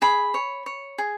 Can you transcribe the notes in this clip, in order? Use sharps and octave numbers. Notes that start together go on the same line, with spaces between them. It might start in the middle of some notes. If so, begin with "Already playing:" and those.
G#4 B5
C#5
C#5
G#4